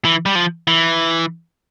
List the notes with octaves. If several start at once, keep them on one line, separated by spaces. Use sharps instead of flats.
E3
G3
F3
E3